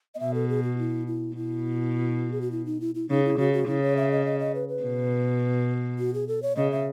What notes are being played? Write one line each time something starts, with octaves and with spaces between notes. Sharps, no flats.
D#5
B2 E5
A4
G#4
F#4
E4
E4
B2 E4
G#4
F#4
E4
D#4
E4
E4
C#3 D#4
E4
C#3 F#4
F#4
C#3 E4
C#5
E5
D#5
D#5
D#5
B4
B4
B2
F#4
G#4
A4
C#5
C#3 D#5
E5